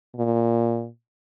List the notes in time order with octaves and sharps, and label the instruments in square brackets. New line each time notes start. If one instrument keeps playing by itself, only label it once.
[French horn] A#2